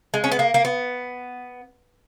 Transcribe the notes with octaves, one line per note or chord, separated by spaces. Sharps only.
G#3
C#4
B3
A#3
A#3
B3